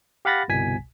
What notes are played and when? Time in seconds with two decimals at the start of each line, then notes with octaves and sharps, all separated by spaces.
0.25 G4 F5 F#5 B5 A6 A#6
0.48 G1 C2 B2 G#5 B6